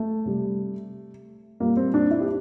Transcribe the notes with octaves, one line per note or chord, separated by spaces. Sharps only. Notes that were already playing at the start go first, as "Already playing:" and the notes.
Already playing: A3
C3 G3
A#2 G3 A#3
C4
D4
E4
G4